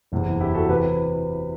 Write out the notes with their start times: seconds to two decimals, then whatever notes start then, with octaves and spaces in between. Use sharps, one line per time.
0.12 F#1 E2 C3 E3
0.40 E4 G4
0.55 F#4 A4
0.69 C3 E3 G4 B4